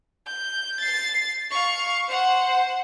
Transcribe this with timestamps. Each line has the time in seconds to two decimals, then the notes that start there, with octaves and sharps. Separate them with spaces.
0.27 G6
0.81 A6 C7
1.50 F5 C#6
2.08 C5 F#5